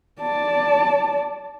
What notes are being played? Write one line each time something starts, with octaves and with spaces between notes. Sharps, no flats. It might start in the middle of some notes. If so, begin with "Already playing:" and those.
D5 A5